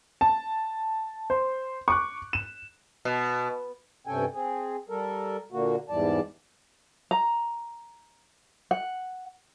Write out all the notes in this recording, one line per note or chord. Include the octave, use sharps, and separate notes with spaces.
A5
C5
C#6 D6 F#6
E7
B2
G2 C3 C#4 A4 G5 G#5
C4 G#4
G3 A4 A#4
A#2 D3 A#3 F#4
E2 G#2 E3 G3 D5 A5
A#5
F#5